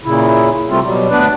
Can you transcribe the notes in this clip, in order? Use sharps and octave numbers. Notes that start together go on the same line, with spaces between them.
A#2 C#3 E4
C3 G3 A3 C4 F4
B2 F#3 G3
D2 B3 D4 B4 D5